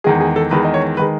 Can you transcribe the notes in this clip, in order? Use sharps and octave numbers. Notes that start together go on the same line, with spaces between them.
E2 D#3 G#3 G#4
G#4
A4
E2 D#3 G#3 B4
D#5
C#5
D#3 G#3 B4